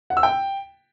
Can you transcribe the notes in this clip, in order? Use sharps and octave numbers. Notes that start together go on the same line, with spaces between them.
F#5
E6
G5